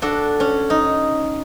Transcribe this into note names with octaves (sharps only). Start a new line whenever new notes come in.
D4 F#4 A4
C#4
D#4